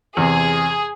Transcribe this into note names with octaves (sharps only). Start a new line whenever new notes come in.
E2 C3 G#4